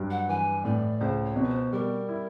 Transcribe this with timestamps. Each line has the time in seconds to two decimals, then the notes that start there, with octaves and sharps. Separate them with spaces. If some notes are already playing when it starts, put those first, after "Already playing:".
Already playing: G2 F#3
0.10 F#5
0.29 E3 G#5
0.65 A2 D5
1.00 C#2 C5
1.24 C#5
1.36 B2
1.44 B4
1.49 C5
1.72 G3 A#4
2.09 E4